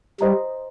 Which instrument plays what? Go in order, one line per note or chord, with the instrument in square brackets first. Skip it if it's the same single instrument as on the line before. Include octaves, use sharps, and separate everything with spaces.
[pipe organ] G3 [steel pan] C5 D#5 A#5